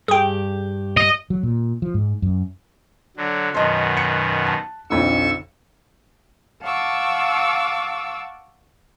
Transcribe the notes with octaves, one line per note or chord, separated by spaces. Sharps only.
G2 G4 G#4 G5
D#5
F#3
A#2
F3
G#2
F#2
D3 F#3
F#2 B2 D#3 D#5 A5 C6
F#6 C#7
A5
B1 F2 D3 C#6 E6
F5 F#5 A5 C#6 D6 E6